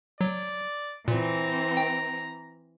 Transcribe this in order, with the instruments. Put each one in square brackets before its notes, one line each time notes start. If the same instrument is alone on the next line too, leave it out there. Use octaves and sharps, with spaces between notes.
[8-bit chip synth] F#3 [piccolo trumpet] D5
[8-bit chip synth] A#2 [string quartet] E3 C4 [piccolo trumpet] A#5
[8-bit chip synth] G5